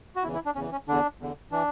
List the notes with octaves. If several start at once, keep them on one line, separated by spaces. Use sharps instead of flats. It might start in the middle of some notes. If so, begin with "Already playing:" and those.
F#4
E2 C#3 E3 E4
E4
D4
E2 C#3 E3 C#4
C#4
E2 D3 D4
E2 D3
E3 D4